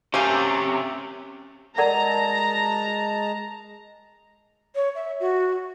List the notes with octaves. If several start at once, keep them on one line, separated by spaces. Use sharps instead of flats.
C3 A3 A#3 C#4 G4 F5 G#5 A#5
G#3 A#4 D5 F#5 A5 A#5
C#5
E5
F#4